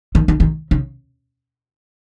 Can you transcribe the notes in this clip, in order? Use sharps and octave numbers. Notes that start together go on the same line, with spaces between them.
D#3
D#3
D#3
C#3